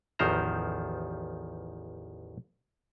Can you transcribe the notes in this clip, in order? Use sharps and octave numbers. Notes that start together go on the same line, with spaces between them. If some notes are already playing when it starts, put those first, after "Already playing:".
A1 E2 D#3 F3 C5 A#5